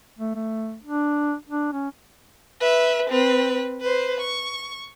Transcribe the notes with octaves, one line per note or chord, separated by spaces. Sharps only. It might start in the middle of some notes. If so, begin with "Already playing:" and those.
A3
A3
D4
D4
C#4
B4 E5
C4 B4
B4 C5
C#6